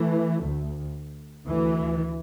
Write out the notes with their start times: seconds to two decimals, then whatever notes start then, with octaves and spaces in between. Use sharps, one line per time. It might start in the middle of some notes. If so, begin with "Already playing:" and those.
Already playing: E3 A3
0.44 D2
1.47 D2 E3